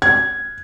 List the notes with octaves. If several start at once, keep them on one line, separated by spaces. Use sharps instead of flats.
G#6